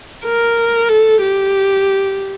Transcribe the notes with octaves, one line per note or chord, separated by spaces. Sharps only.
A#4
A4
G4